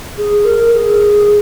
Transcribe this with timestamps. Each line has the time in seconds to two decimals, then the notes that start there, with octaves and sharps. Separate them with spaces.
0.18 G#4
0.45 A#4
0.73 G#4